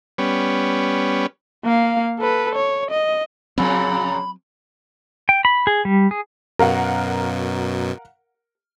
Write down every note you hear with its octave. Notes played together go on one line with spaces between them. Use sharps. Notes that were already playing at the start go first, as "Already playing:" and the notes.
G3 B3 C#4
A#3 F5
A4 B4
C#5
D#5
F2 A#2 C#3 F#3 C4 B5
G5
B5
G#4
G3
G#4
F#2 B2 A#4 F5 F#5